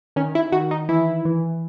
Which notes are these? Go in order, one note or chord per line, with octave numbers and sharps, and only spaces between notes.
D#3 C#4
E4
D#3 F#4
D#4
E3 E4
E3